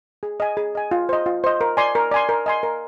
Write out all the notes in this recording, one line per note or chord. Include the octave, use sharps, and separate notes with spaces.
G#4
D#5 G#5
G#4
D#5 G#5
F4
C5 D#5
F4
C5 D#5
A#4
D5 G#5 C6
A#4
D5 G#5 C6
A#4
D#5 G#5 C6
A#4